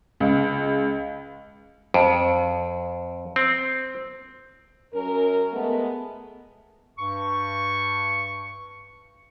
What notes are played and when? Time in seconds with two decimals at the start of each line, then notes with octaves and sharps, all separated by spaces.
0.20 C#2
1.94 F2
3.36 C4
4.94 F#2 C#4 A#4
5.52 G#3 A3 B3
6.99 G2 C#6